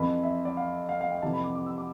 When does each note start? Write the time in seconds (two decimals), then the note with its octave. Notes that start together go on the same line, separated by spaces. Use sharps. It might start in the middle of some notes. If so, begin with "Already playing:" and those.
Already playing: F2 E3 B5
0.23 E5
0.45 D5
0.57 F5
0.89 F5
1.01 F5
1.11 G5
1.22 F2 C3 E3 A5
1.33 B5
1.44 D6
1.55 D6
1.66 E6
1.78 D6